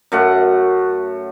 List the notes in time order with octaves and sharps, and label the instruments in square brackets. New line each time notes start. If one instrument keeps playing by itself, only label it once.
[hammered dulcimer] F#2 A3 F#5